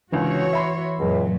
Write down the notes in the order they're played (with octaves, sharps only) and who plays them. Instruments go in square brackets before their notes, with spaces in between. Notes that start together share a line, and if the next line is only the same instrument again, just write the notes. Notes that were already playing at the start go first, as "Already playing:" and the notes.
[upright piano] C#2 D3 [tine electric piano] E3 [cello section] F#4 C#5
[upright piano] E5 B5 C6
[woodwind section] C#2 [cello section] F#2 A#2 F#3